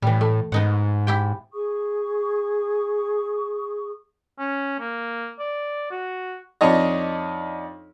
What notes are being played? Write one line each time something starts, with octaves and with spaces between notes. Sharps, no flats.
A2 E3 G3
A3
G#2 B3 D#4 F#5
E4 G4 G5
G#4 C#6 D#6
C#4
A#3
D5
F#4
F2 D4 D#4 C#5 D#5